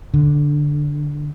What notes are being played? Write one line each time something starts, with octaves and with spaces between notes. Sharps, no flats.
D3